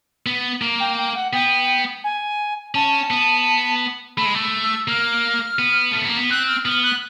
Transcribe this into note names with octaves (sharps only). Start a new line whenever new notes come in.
B3
A#3
G5
G5
F#5
B3 G5
G#5
C#4 A5
B3
A3 B5
G#3
A3
E6
A#3 F6
B3
A3
A#3
B3
C4 F#6
F6
B3 F6
F#6